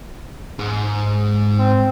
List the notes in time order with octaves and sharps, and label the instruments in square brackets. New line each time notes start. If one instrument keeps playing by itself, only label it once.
[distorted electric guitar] G#2
[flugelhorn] C4